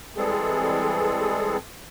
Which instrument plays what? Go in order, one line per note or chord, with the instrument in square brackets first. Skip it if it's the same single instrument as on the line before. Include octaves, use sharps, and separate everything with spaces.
[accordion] E3 G3 G#3 C4 G#4 A4